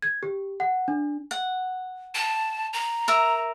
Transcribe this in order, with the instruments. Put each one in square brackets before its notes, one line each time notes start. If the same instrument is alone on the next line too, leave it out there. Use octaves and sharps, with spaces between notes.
[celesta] G#6
G4
F#5
D4
[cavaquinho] F#5
[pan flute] A5
A#5
[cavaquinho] A#4 E5